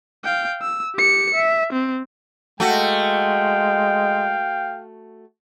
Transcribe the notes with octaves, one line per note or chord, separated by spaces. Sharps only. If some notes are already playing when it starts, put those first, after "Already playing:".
F5 G5
E6
G4 C#7
E5
C4
G#3 A3 F#4 F5 G5